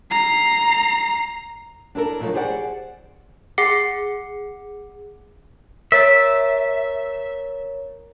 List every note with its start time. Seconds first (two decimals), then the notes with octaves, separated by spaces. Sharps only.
0.11 A#5 C7
1.95 D4 E4 A4 A#4
2.21 B2 F3 F#3 A3
2.34 G4 G#4 C5 D5 D#5 F#5
3.58 G#4 F#5 D6 C7 C#7
5.92 A#4 C#5 E5 A6